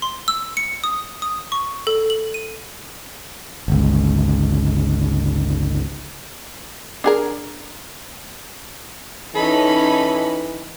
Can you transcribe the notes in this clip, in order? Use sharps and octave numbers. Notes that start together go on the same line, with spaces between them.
C6
E6
C#7
D#6
D#6
C#6
A4
F#7
D#7
G1 C#2
D4 G#4 A#4
E3 C#4 D#4 A4 B5